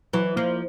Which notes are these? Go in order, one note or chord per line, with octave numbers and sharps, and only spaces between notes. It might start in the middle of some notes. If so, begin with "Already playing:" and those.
E3 F#3
F3 A#3